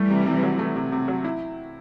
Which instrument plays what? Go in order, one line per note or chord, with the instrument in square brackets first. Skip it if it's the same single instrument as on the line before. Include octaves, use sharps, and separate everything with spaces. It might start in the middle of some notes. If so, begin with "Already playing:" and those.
Already playing: [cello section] E3 G3 [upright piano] A3
[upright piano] C3
C3
F#3
A3
C3
C3
F#3
E4